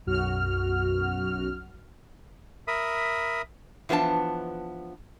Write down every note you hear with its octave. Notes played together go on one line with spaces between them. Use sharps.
B1 F#2 F#4 F6
A#4 E5 B5 D#6
E3 F3 B3 D4 A5